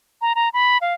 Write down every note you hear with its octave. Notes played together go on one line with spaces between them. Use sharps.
A#5
A#5
B5
F5